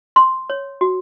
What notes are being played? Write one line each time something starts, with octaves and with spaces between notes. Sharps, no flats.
C6
C#5
F#4